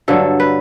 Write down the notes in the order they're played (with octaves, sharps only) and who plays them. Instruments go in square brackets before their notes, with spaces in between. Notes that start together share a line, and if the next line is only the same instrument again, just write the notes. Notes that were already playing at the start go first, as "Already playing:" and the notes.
[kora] G2 D3 F#3 A4
B4